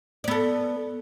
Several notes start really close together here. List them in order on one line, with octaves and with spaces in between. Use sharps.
D5 B3 A4